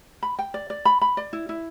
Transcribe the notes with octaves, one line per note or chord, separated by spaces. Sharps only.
B5
G5
D5
D5
B5
B5
D5
E4
E4